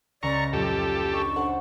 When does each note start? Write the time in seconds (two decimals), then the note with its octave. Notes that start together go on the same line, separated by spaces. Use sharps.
0.23 C#2 D5 A#5 C#6 B6
0.53 F2 A#2 F#3 F4 G4 A4
1.12 D4 D#4 C#6
1.36 D4 A4 C5 F#5